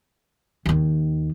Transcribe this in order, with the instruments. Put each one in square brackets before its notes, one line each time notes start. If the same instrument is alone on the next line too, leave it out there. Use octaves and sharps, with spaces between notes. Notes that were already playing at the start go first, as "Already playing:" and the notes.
[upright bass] D#2 D#3